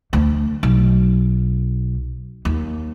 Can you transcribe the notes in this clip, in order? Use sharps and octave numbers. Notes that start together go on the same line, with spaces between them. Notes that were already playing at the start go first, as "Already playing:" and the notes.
D2
B1
D#2